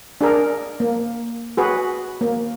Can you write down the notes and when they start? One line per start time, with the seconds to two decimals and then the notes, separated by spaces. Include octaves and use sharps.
0.21 D4 G#4 A#4
0.80 A#3
1.57 F#4 G#4 B4
2.21 A#3